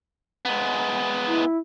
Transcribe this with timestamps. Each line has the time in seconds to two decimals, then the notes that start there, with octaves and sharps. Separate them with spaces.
0.45 G#3 B3
1.27 E4